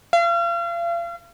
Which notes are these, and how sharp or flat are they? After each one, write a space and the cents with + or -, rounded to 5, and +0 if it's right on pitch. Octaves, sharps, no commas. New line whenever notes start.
F5 -35